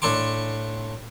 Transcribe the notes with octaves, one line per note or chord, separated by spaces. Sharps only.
A2 D4 A4 G#5 C6 D6